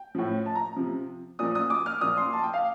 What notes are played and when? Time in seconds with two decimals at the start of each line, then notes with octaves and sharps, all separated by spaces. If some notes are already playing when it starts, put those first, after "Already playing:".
Already playing: G5
0.15 A2 F3
0.46 A5
0.55 A#5
0.76 C3 F3
1.39 A#2 F3 D#6
1.55 D#6
1.70 D6
1.86 F6
2.01 A#2 F3 D#6
2.17 C6
2.33 A5
2.43 G5
2.54 F5